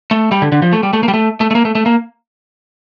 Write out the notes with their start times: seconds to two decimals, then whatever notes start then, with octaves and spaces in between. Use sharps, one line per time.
0.11 A3
0.32 G3
0.42 D3
0.52 D3
0.62 F3
0.73 A3
0.83 G3
0.93 A3
1.03 A#3
1.08 G3
1.14 A3
1.41 A3
1.51 A3
1.55 A#3
1.65 A3
1.75 A3
1.86 A#3